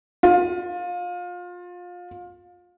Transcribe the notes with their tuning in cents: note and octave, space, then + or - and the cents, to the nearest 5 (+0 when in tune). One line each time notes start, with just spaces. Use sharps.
F4 +25